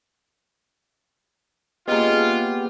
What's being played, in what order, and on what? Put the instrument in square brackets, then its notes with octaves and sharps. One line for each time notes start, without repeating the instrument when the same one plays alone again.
[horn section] G#3 C#4 F4 [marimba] A#3 G#4 D#5 [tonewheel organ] B3 G4